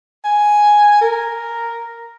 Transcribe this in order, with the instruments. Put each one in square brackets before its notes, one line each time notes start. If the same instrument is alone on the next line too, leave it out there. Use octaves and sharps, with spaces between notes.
[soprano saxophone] G#5
A#4